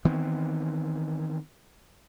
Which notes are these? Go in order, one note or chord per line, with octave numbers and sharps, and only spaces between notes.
D#3 E3 B3 C4